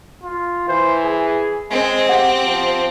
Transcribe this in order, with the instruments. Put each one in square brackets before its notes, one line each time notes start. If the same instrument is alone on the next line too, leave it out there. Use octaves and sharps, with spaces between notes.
[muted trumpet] F4
[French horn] E3 [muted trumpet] C5
[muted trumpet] G#4
[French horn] G#3 [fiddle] C4 [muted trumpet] G#5
[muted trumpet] G4 [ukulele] F#5
[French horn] F3